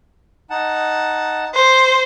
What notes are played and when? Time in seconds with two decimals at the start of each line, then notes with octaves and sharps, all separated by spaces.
0.50 D#4 F#5 A5
1.54 C5